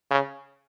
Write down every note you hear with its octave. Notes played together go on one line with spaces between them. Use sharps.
C#3